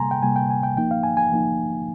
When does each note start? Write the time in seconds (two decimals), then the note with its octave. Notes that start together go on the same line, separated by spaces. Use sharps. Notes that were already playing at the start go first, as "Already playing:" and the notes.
Already playing: C3 G3 A#3 G#5 A#5 C6
0.11 G5
0.23 C3 G3 A#3 G#5
0.36 G5
0.50 G#5
0.63 G5
0.77 F3 A#3 D#4 G5
0.91 F5
1.03 G#5
1.17 G#5
1.32 F3 A#3 D#4